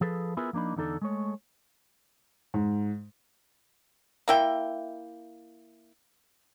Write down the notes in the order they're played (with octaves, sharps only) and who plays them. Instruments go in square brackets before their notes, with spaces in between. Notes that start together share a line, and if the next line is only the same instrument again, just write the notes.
[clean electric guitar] F3 G#4 A4 B4
B3 E4 F4 G#4 A#4 B4
F3 A#3 D4 D#4 B5
E2 D3 D#4 A4 D5
G#3 A3 C#5
[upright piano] G#2
[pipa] A#3 E4 G5